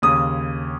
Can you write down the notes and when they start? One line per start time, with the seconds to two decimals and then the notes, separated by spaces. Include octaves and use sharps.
0.02 D#2 C#3 D#6